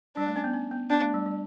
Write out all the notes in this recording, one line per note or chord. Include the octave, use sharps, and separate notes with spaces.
G3 D4
A3
C#4
B3
C#4
B3
B3 D4
A3
G3
G3